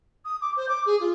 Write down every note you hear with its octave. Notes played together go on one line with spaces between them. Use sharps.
D#6
D6
C5
D6
G#4
F4